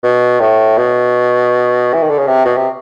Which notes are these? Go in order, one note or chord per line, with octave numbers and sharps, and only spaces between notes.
B2
A2
B2
E3
D#3
D3
C#3
C3
B2
C3